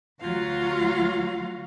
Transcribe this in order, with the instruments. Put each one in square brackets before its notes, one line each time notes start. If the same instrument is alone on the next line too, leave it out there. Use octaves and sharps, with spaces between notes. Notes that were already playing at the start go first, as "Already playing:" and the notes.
[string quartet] D2 F#3 F4 F#4 F5